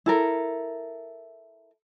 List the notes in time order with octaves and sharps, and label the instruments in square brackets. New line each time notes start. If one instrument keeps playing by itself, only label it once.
[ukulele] E4 A4 A#4